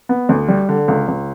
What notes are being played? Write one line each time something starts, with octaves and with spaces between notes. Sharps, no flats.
B3
D2
G3
D3
C#2
C#2